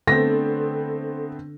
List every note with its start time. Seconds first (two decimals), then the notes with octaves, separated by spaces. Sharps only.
0.07 D3 A3 B3 C4 A4 A#6